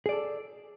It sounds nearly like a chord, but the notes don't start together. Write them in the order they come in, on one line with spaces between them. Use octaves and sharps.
G#4 D5 A4